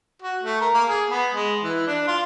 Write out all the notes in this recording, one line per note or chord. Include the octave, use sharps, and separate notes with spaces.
F#4
A3
A#4
A#3
G#4
B3
G#3
E3
D4
F4